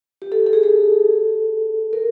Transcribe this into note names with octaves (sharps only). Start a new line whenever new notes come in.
G4
A4
A4
G#4
A4
A#4